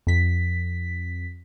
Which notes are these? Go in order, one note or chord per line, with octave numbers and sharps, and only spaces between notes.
F2 B6